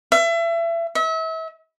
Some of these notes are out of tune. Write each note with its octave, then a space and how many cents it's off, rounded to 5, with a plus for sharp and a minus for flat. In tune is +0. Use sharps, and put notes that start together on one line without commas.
E5 +30
E5 -35